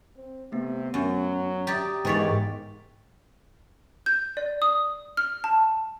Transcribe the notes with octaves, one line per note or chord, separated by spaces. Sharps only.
C4
C3 A3 B3
F#2 F#3
G4 D5 A#5 D#6
E2 G#2 D#3 C#5 D5 G5 B6
G6
D5
D#6
F6
A5